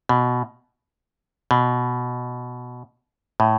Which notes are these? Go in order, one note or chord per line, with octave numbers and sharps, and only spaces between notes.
B2
B2
A2